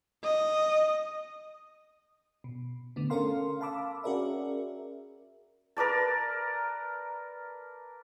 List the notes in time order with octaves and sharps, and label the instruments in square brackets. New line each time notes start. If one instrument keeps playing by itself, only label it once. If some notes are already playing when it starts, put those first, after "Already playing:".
[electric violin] D#5
[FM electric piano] B2
D3 A3 B3
C#4 A4 A#4 F5 C6
F5 A5 B5 D6 E6
C#4 F#4 G#4 A#4 D5 E5
[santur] A#4 B4 D5 A5